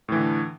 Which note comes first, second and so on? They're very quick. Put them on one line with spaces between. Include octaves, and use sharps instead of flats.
A2 E3 D3